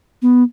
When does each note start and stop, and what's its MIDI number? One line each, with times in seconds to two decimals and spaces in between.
0.22 0.43 59